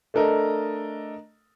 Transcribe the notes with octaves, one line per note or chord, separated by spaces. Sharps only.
A3 D4 A4 A#4 D#5